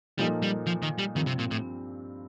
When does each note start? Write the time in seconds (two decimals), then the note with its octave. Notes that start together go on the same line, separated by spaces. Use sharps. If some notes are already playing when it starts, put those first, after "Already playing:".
0.18 A#2 F3 G3 A#3 D#4 A4
0.43 G3
0.67 F3
0.82 D#3
0.99 G3
1.15 G2 D#3 F3 C4
1.27 C3
1.39 A#2
1.51 A2